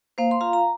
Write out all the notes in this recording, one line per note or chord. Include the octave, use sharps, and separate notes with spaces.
A#3 C5 F5
C6
F4 F5 A#5
A#5